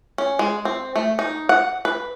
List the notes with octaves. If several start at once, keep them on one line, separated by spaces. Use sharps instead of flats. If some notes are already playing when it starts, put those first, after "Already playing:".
C#4
G#3
C4
A3
D#4
F#5
B4